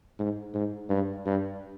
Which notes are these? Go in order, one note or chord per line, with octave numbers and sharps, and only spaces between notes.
G#2
G#2
G2
G2